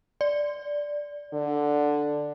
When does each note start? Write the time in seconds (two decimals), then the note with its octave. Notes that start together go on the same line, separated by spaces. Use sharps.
0.21 D5
1.33 D3